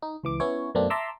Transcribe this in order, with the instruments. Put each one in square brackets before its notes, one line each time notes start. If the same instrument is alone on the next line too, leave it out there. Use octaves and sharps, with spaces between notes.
[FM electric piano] D#4
C#2 E3 D6
B3 C#4 E4 C#5
F#2 B2 A3 A#3 C4 D4
E5 A5 A#5 C6 D6 E6